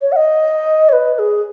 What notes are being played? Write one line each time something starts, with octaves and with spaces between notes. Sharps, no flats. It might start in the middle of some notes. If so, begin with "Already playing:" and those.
C#5
F#5
D#5
C#5
B4
B4
G#4